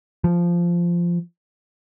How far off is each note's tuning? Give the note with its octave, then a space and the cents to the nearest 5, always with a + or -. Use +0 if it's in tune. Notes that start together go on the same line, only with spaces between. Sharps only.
F3 -10